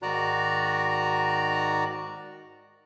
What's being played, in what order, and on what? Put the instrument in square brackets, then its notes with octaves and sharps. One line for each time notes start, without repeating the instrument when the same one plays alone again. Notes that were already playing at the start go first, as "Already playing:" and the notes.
[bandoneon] G#2 D#3 F#4 D5 A#5 F#6